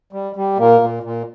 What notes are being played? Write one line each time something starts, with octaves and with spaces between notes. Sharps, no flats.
G3
G3
A#2 A#3
A#2
A#2